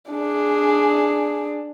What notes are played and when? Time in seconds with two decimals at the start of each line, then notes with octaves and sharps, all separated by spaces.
0.12 D4 G#4